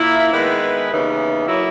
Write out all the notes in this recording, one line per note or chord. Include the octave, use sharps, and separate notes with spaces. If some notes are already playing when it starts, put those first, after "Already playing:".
Already playing: A#2 A#3 E4
D#3 G#3 B3 E4 B4
D#2 C#3 E3 B3 D#4
F#3 A#3 E4